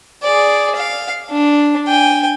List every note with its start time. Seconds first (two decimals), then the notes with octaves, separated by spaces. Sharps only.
0.24 G#4 D5
0.76 F5
1.30 D4
1.88 G5 G#5